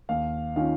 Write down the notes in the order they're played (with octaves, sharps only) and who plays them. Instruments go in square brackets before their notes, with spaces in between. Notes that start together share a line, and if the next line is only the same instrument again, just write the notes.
[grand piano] D#2 F5
D#3 C#4 F4 F5